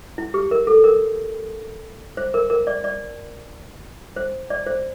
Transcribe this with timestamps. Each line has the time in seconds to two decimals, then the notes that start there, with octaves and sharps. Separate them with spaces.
0.18 E4
0.34 G4
0.51 A#4
0.67 A4
0.84 A#4
2.17 C5
2.34 A#4
2.50 A#4
2.67 D5
2.84 D5
4.16 C5
4.50 D5
4.66 C5